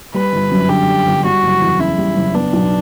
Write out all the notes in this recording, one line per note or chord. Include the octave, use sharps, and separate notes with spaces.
G3 B4
G1
F#2
D3 G4
G3
G1
G3 F#4
F#1
E2
C#3 E4
G3
F#1
B3 D4
B1